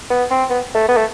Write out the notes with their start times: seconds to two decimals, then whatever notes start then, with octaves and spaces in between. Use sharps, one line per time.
0.10 B3
0.30 C4
0.50 B3
0.75 A3
0.88 B3
0.97 A3